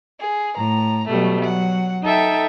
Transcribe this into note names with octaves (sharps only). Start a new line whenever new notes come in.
G#4
A2 A#5
B2 F#3 G3 A3
F#3 F#5
D#4 A4 E5 G5